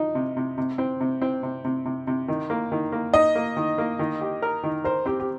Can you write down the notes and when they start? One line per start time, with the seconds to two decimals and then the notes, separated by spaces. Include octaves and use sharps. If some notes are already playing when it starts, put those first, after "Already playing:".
Already playing: F3 D#4
0.15 C3
0.37 C3
0.58 C3
0.78 C4
1.00 C3
1.21 C4
1.43 C3
1.64 C3
1.85 C3
2.07 C3
2.28 D#3
2.50 A#3
2.72 D#3
2.92 A#3
3.13 D#4 D#5
3.35 A#3
3.57 D#3
3.78 A#3
3.99 D#3
4.21 G4
4.42 A#4
4.63 D#3
4.84 A#4 C5
5.06 C4 G4
5.20 G4